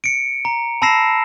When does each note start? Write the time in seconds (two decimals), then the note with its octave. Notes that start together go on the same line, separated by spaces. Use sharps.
0.04 C#7 D7
0.45 A#5
0.82 A5 B5 E6 A#6 C7 E7